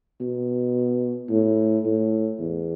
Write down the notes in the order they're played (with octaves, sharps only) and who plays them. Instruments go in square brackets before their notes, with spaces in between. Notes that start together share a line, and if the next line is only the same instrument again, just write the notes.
[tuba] B2
A2
A2
E2